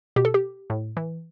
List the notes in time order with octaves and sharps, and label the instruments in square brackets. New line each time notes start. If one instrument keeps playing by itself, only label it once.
[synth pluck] B2 G4
A4
G4
A2
E3